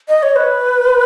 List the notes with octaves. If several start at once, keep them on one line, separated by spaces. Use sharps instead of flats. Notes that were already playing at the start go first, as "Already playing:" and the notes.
D#5
C#5
B4